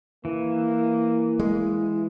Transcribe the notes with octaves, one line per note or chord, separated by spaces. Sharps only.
E3 A#3
G#3